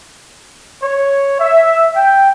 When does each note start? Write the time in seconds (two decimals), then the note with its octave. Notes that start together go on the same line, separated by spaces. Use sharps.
0.82 C#5
1.40 E5
1.96 G5